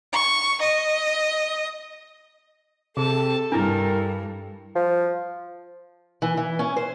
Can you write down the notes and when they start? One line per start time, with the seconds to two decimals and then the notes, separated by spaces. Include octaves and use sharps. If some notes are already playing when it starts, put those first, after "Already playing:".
0.13 C#6
0.61 D#5
2.97 C3 G#4 A4 A5
3.52 G2 D4 E4 A#4
4.75 F3
6.22 E3
6.37 E3
6.59 C#4
6.77 C5